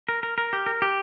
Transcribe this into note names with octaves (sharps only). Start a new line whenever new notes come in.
A#4
A#4
A#4
G4
A#4
G4